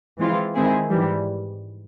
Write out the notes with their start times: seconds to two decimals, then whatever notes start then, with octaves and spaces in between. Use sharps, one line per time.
0.19 E3 G#3 C4 F4
0.55 D#3 G#3 C4 E4 G#4
0.89 G#2 E3 G3